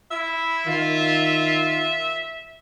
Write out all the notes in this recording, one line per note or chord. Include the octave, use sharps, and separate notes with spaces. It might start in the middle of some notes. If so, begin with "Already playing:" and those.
E4 E5
D#3 F4